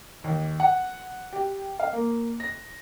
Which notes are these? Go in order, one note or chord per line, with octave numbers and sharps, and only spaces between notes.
D#2
F#5
G4
F5
A#3
A#6